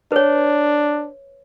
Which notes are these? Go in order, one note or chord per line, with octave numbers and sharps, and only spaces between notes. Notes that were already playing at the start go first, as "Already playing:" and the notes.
D4 B4 C#5